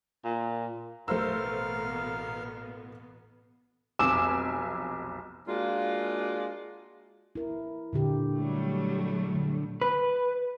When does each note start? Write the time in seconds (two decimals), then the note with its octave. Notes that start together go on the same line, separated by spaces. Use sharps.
0.24 A#2
1.08 A1 B2 A3 B3 A#4 C5 F5 E6
3.99 F1 B1 G#5 D6 E6 E7
5.47 G#3 A#3 D4 F4 F#4
7.35 E4 A#4
7.93 A#2 D3 G4
8.35 F#3 G3 A3
9.35 D3
9.82 B4